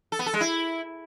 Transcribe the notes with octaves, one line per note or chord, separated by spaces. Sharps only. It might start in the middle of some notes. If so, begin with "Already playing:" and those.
A4
B3
A4
G#3
E4